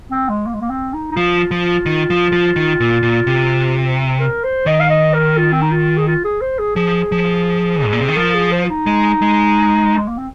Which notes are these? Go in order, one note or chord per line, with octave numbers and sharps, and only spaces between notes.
C4
G#3
A#3
G#3
A#3
C4
D#4
D#4
F3 F4
F3
D#3
F3
F3
D#3
A#2
A#2
C3
A#4
C5
D#3 D#5
F5
D#5
A#4
F4
C4
D#4
F4
G#4
F4
G#4
C5
G#4
F3 G#4
F3
G#2
A#2
C3
D#3
F3 A#4
G#4
C5
F4
D#4
G#3
G#3
G#3
A#3
C4